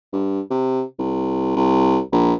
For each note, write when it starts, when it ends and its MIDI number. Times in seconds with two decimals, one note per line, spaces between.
0.13 0.41 43
0.50 0.83 48
0.99 1.51 36
1.56 2.00 36
2.13 2.33 34